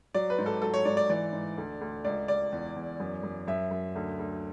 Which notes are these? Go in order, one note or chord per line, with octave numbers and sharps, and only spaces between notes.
F#3 D5
B4
G#2
A4
F#3 A4
C#5
G#2 D5
D5
E3 D5
G#2
D2
D2
C#2 D5
C#2 D5
E2
E2
F#2
F#2
F#2 E5
F#2
D2
D2